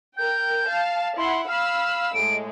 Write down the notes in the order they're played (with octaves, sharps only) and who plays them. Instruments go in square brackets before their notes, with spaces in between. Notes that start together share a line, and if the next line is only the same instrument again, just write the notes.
[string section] A#4 G5 [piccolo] G6
[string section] F5 A5
[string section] E4 F#5 [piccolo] C6
[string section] F5 B5 E6 [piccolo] F6
[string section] A2 G#3 [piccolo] D7